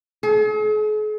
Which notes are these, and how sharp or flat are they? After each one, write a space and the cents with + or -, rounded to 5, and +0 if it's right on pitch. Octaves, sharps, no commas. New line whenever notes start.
G#4 +45